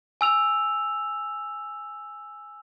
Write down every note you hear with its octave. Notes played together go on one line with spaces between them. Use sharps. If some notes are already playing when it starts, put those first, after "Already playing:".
G#5 E6 F7